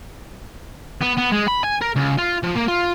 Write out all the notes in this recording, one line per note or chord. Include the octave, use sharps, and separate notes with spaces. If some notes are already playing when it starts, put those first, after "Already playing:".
B3
B3
G#3
B5
G#5
A#4
C#2
F4
F3
A#3
F4